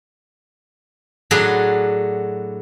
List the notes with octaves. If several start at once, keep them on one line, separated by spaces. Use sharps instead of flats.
A2 F#3 D4 G#4